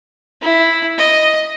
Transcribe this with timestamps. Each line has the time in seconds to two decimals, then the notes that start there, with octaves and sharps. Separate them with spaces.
0.42 E4
0.98 D#5